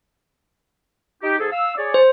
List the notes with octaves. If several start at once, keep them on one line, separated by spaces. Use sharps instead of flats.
D#4 G4
G#2 G#4 A4
F5 E6
G#4 C#5 D5
C5